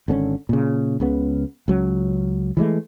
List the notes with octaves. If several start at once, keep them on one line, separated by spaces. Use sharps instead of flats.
G#1 D3 C4 C#4
A#2 C#3
C#2 C#3 B3
C#2 F#3 C#4
E3 F3 G#3 A3